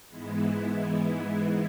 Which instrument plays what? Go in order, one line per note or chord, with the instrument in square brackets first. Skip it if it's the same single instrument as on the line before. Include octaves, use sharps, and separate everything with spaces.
[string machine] G#2 E3 G#3 B3 E4